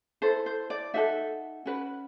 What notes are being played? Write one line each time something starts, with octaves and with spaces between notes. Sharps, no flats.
E4 A4 C5
C5
D5
D#4 F#4 A4 E5
C#4 F#4 B4